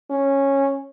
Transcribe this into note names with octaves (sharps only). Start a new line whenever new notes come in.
C#4